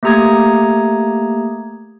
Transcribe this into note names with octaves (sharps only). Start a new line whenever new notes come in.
A3 A#3 G4 A#5 D#6 G#6